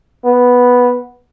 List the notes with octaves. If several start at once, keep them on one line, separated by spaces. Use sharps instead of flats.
B3